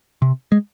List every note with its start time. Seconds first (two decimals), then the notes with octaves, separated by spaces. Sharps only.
0.22 C3
0.52 G#3